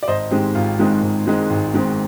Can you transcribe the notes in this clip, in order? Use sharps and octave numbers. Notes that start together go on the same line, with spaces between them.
D5
G#1 C5 D#5
G#2 D#3 G#3 C4 G4
G#1 F4
G#2 D#3 G#3 C4
G#1
G#2 D#3 G#3 C4
G#1
G#2 D#3 G#3 C4